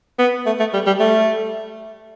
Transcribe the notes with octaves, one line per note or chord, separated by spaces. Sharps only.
B3
A3
A3
G3
G3
A3